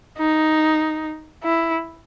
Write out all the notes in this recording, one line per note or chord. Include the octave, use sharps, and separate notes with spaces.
D#4
E4